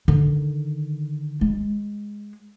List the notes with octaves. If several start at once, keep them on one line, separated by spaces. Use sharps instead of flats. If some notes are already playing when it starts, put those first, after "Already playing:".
D3 D#3
G#3